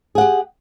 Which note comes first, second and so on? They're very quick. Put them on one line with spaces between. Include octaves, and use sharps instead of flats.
G#4 F#5 G4